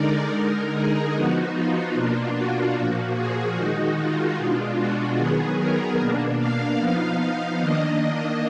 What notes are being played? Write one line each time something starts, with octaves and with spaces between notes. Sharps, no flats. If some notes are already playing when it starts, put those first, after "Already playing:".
Already playing: D3 G#3 D#4 A#4 D5
D3 G#3 D#4
G#4
F3 B3 D#4 F#4
F4
B2 A#3 D4
F#4
A#2 F3 A#3
G#4
D#3 G#3 D#4 F#4
F4
B2 G#3 D4
F#4
D#3 F#3 B3 G#4
A#4
B2 A#3 D4
F5
F3 B3 D#4
D#3 A#3 D4 D#5